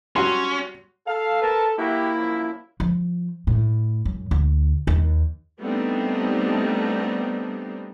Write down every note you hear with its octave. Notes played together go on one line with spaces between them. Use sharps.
F#3 G3 C#4 F#4 C6
A4 F5
A#4 B4 A5
F#3 A#3 E4 F#4 G4
C2 F#2 F3
F3
A2
F#2
D2
D#2
G3 A3 B3 C4 D4 D#4